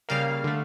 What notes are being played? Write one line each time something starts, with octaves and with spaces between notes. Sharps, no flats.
C#3 G3 A#3 F5
D3 A3